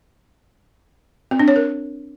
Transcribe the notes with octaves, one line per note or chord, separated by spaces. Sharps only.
C4
D4
C#5
A#4